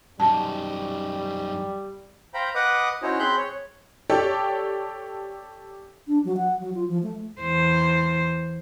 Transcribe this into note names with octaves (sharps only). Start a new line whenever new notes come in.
F#2 G3 D#4 A5
C5 F5 G5 A#5 B5
B4 D#5 F#5 D6 D#6
C#4 D#4 E4 F#4 C5 C#5
C4 G#4 B5 C6 F#6 G6
C#5
G4 A4 C#5 D5 G5
D4
F#3
F#5
F#3
F4
F3
A3
E2 C5